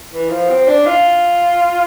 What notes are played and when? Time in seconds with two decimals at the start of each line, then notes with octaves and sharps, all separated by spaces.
0.11 E3
0.30 F3
0.49 C4
0.68 D4
0.86 F4